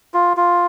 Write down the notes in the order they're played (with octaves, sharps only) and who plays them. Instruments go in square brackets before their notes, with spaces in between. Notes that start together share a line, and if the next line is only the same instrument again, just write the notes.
[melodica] F4
F4